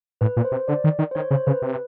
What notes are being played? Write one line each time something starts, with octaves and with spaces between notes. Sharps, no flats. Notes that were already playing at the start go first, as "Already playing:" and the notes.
A2 B4
A#2
C5
C3
D3 D5
D#3
D#3
C5
D#3 C#5
C#3 C5
C#3 B4
C3